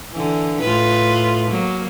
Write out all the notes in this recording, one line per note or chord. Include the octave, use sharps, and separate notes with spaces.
D3 E3
A2 F4 B4
F#3 A#3